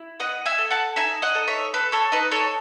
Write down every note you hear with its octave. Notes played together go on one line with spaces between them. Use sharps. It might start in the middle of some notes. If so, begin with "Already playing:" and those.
Already playing: E4
B3 D#5 F#5
E5 G#5
A4
F#5 A5
D#4 E5 G#5
D#5 F#5
A4
C#5 E5
A4 B4
A4 C#5
D#4 B4 D#5
A4 C#5